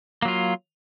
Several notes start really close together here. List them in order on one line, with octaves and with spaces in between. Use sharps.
A#3 F#3 F4